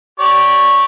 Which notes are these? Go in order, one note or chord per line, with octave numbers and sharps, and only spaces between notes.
G4 C#5 D5